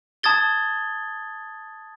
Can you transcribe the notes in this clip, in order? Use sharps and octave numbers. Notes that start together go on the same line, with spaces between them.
A5 D#6 G#6 A6 G7